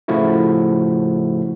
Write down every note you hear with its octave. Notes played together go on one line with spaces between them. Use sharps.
A2 C#3 F3 A3 E4 F#4